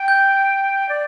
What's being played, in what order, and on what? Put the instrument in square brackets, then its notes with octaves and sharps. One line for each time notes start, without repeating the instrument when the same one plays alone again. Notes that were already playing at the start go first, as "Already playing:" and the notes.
Already playing: [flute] G5
[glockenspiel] G6
[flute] D5